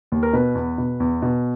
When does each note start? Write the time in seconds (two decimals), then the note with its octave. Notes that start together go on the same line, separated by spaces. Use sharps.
0.12 D#2
0.23 A#4
0.33 B2 B4
0.55 E2
0.78 B2
1.00 E2
1.22 B2